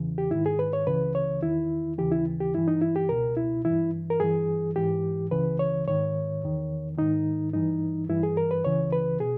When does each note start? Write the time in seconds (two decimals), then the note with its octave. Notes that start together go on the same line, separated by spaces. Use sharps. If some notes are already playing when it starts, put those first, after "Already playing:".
Already playing: E2 C#3 E3
0.18 G4
0.31 G#2 D#3 E4
0.46 G#4
0.59 B4
0.73 C#5
0.87 C#2 C#3 E3 B4
1.15 C#5
1.42 E2 D#3 E4
1.98 D#2 C#3 E3 G4
2.12 E4
2.40 G4
2.54 G2 E3 E4
2.68 D#4
2.82 E4
2.96 G4
3.09 C#2 B2 A#4
3.37 E4
3.65 G2 E3 E4
4.10 A#4
4.20 G2 E3 G#4
4.76 G#2 E3 G4
5.31 C#2 C#3 E3 B4
5.59 C#5
5.87 G#2 D#3 C#5
6.43 E2 D#3
6.98 G#2 D#3 D#4
7.53 G2 E3 D#4
8.09 G2 E3 E4
8.23 G#4
8.37 A#4
8.51 B4
8.65 C#2 C#3 E3 C#5
8.93 B4
9.20 B2 G#4